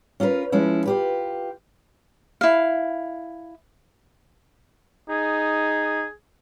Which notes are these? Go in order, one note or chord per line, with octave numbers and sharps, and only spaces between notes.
C#4 F4 A#4 B4
F3 G#3 C#4 E4
F4 G4 B4
E4 F5
D#4 G#4